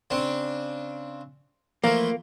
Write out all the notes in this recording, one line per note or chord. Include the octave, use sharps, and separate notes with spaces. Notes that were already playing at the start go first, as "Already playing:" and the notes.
C#3 C4 D4
E3 F3 A3 A#3